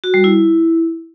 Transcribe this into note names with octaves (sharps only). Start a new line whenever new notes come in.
F#4
G3
E4